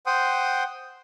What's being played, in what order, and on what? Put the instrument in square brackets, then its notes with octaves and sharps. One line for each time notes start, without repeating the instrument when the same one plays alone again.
[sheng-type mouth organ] C5 F#5 G5 C6 D#6